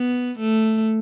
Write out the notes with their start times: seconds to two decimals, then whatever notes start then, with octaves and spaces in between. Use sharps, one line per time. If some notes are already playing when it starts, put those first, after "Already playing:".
Already playing: B3
0.39 A3